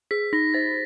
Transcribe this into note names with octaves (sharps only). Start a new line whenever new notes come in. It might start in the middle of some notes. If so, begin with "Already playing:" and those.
G#4 B6
D#4 A#6
C5 A6